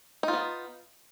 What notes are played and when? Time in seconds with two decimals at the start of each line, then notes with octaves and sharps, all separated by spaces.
0.23 D#4
0.28 F4
0.33 B3